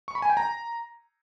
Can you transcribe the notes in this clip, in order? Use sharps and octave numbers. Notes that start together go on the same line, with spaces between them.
C#6
B5
G#5
G5
A#5